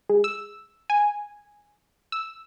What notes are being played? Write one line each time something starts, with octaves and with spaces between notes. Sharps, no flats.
G#3
E6
G#5
E6